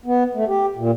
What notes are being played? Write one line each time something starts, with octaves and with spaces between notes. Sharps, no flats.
B3
A3
G4
A#2